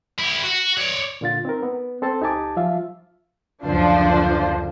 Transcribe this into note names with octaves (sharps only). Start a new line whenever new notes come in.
E4 G4
F#4
C#5 D5
A#2 D3 F4 A6
C4 D#4 A#4
B3
C4 A4 C5 A5
C#2 D#4 G4 G#5 A5 D6
F3 F#3 F4 E5 F5
F#1 D2 F3 D4 C5